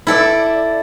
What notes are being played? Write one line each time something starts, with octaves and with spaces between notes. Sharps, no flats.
E4 A4 D5